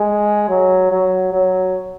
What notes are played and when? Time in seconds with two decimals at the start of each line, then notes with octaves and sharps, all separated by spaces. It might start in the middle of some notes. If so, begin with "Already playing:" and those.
Already playing: G#3
0.49 F#3
0.91 F#3
1.33 F#3